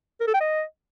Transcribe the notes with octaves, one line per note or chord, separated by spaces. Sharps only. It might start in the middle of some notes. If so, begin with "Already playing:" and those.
A#4
A4
G5
D#5